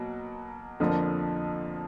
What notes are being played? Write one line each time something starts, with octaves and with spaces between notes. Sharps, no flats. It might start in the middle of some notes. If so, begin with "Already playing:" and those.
Already playing: B2 F#3 A#3
F2 D3 F3 A#3